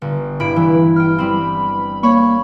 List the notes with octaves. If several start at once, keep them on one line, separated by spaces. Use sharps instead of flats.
G1
G2 E4 B5 D7
E3
G5 F6
G3 C4 B5
A#3 C#5 B5 C#6